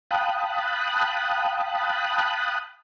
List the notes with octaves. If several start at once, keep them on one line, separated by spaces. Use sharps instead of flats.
F5 G5 A5 B5 D#6 F#6